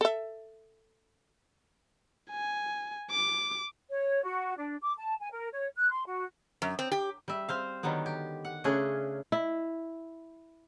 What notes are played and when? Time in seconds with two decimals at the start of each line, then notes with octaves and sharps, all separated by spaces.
0.01 A4 E5
2.31 G#5
3.11 D6
3.90 C#5
4.23 F#4
4.57 D4
4.81 D6
4.98 A5
5.20 G#5
5.31 A#4
5.52 C#5
5.76 F#6
5.91 C6
6.06 F#4
6.62 F#2
6.79 C4
6.92 G4
7.28 G3 E5
7.49 C4 C5 F5
7.83 D3 D#3 F#3 G3 B3
8.06 G4
8.45 F#5
8.64 C#3 A3 C#4 D4 G#4
9.32 E4